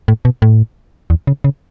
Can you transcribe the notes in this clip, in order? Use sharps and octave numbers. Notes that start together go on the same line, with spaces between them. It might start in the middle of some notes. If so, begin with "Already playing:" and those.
A2
B2
A2
E2
C#3
C#3